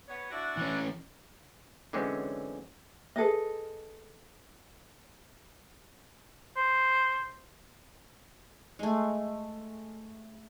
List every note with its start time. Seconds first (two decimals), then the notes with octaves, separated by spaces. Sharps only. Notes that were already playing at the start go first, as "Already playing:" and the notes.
0.08 B3 C#5
0.31 D4 E4 F#4
0.57 E3 C#4
1.93 D3 E3 F#3 G#3 C4 C#4
3.16 G#4 A4 B4 D#5
6.56 C5
8.79 G#3 A3